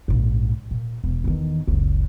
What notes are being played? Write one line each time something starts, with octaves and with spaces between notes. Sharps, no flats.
A#1 G#2
A#2
E1
E2 D#3
F#1 C#2